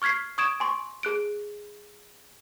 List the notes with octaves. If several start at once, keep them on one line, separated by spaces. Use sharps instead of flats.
C#6 F6 G#6 B6 C7
C#6 D#6 G#6 D7 E7
G#5 C6 C#6
G#4 F#6 D7